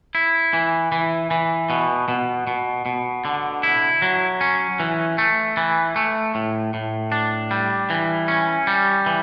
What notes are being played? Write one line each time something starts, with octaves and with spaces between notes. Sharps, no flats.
E4
E3
E3
E3
B2
B2
B2
B2
D3
E4
F#3
C#4
E3
A3
E3
A3
A2
A2
D4
G3
E3
C#4
G3
E3